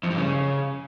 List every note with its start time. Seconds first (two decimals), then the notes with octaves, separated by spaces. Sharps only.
0.03 F2
0.10 G2
0.17 C#3